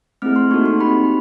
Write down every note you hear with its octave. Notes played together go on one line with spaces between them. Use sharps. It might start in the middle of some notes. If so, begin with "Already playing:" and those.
A3 C4 E4 G#4 F6
C6
A#3 D#4 F#4 A4 C#6
C6
C4 D#4 G4 B5